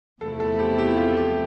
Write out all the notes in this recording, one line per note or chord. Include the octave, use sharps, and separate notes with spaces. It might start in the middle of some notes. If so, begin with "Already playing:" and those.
E2 C3 F3 A3 E4 A4
A4
G4
G4
F4
G4